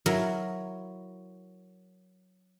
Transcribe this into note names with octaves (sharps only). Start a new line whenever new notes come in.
F#3 E4 A#4